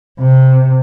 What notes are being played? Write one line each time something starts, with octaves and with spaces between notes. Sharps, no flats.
C3